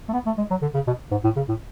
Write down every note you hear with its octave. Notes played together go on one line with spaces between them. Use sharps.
A3
B3
A3
G#3
F#3
D3
C#3
B2
G#2
A2
C#3
A2